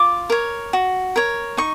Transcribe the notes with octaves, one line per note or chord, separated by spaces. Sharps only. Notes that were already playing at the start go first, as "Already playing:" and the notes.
Already playing: F4 D6
A#4 C#5
F#4
A#4 C#5
D#4 C#6